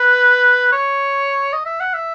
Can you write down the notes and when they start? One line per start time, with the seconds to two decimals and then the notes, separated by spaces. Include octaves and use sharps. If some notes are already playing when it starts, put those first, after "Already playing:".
Already playing: B4
0.72 C#5
1.53 D#5
1.66 E5
1.81 F#5
1.94 E5